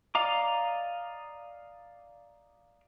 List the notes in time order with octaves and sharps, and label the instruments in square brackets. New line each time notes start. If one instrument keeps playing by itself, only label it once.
[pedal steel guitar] D5 D#5 F5 A#5 D6